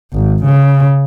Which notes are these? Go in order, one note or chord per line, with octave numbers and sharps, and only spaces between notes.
G#1
C#3